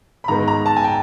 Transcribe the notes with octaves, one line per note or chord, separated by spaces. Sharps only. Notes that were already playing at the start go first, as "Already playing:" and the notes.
B5
G#2 D#3 G#3 B3 A#5
A#5
A5
G#5
G5